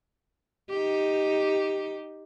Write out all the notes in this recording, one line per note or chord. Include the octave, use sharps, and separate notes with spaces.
D#4 G4